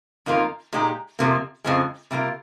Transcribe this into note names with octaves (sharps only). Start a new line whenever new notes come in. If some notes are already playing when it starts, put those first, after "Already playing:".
F2 D#3 A#3 F4
A#2 G#3 D#4 G4
F2 C3 F3 A#3
F2 C#3 F3 G#3
C3 G3 A#3 F4